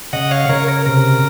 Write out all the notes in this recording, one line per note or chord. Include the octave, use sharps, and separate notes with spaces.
C#3 D#5 F#5
C#5 F5
C#3 A#4 C#5
A#4
C3 A#4